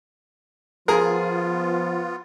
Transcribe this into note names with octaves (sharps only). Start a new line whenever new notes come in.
F3 B3 F4 G#4 A#4